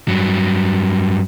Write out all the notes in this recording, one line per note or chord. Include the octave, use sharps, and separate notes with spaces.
G2 F#3